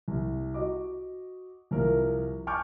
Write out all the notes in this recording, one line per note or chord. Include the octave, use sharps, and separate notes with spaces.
C2
F#4 D#5 D6
C2 F3 A#4
G#5 A5 C#6 D6 F6 G6